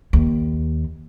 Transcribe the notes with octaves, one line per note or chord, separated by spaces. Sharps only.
D#2